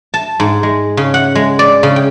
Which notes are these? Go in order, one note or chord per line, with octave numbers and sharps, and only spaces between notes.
A5
G#2
G#3
C#3
F#5
G#3
D5
C#3
G5